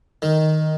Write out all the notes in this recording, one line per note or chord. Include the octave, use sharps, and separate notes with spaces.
D#3